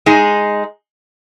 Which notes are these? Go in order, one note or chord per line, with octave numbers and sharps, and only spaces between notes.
G#3 D#4 G#4